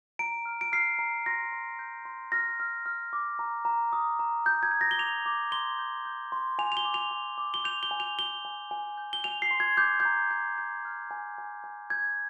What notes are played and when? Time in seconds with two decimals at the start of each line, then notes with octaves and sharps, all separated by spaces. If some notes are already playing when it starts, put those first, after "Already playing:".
0.19 A#5 D7
0.46 F6
0.61 D7
0.72 F6 C7
0.99 A#5
1.26 C6 A#6
1.53 C6
1.79 G6
2.05 C6
2.32 F6 A#6
2.60 F6
2.86 F6
3.13 D6
3.39 A#5
3.65 A#5
3.93 D#6
4.19 A#5
4.46 G6
4.63 G#6
4.72 G6
4.81 A#6
4.91 G7
4.98 D6 F7
5.26 D6
5.52 C6 G7
5.79 G6
6.05 G6
6.32 C6
6.59 G#5 F7
6.72 F7
6.77 G7
6.85 D6
6.94 F7
7.11 G#5
7.38 D6
7.54 G7
7.64 G6 F7
7.83 G7
7.91 G#5
8.00 F7
8.18 G#5 G7
8.45 G#5
8.71 G#5
8.98 G6
9.13 G7
9.24 G#5 F7
9.42 C7
9.51 C6
9.60 G#6
9.77 D6 G6
10.00 G6
10.05 A#5
10.31 G6
10.58 G6
10.85 F6
11.11 G#5
11.38 G#5
11.64 G#5
11.90 G6 G#6